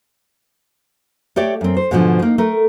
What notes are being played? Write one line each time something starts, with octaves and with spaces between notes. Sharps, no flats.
A3 G4 C#5 D5
F#2 C4
C5
G#2 B2 D3 D#3 F3
A#3 D#4
A3 A#4